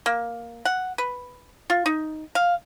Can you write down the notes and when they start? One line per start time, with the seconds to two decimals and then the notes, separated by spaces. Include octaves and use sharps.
0.06 A#3
0.65 F#5
0.98 B4
1.70 F4
1.86 D#4
2.35 F5